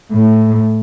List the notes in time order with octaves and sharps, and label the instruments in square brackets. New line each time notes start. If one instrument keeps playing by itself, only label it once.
[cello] A2